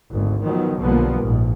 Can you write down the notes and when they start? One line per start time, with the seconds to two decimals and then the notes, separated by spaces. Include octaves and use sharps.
0.11 G#1 D2
0.43 D#3 F3 F#3 B3
0.79 B1 D3 F3 G3 A#3 B3
1.19 A#1 G#2